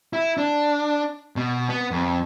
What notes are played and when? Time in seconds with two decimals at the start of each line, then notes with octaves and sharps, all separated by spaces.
0.13 E4
0.38 D4
1.36 B2
1.69 B3
1.91 F2